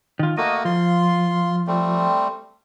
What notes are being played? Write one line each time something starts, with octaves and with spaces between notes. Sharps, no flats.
D#3 F4
A3 A#3 F#4 D#5
F3 F4 C6
G3 A3 C4